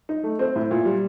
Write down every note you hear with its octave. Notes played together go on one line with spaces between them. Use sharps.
D#4
A3
C4
A2
A#2
G3